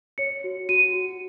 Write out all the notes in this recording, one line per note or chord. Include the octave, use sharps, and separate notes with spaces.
C#5 C#7
F#4
F#4 D#7
F#4